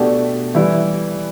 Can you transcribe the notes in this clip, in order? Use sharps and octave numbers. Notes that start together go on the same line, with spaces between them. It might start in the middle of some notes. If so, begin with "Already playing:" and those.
Already playing: B2 A3 D4 G4
E3 G3 E4